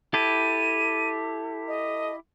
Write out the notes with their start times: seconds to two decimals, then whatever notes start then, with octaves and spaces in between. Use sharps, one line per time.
0.14 E4 G4 A4 D#7
1.68 D#5